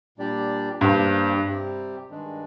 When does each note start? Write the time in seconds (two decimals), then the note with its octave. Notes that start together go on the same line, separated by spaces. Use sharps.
0.18 A#2 G3 D4 G4 D5
0.81 G2 G3 A#3 D4 G4 C5
1.45 C3 G3 C4 G4
2.09 G2 D#3 G#3 D4